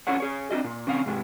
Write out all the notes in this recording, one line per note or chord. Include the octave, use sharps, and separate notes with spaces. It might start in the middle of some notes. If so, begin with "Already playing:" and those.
C#4 F4 A4 C#5 F#5
G#4 C#5
C4 D4 F4 F#4 D#5
A#2
C#3 C4 F5
G#2 C3 G#3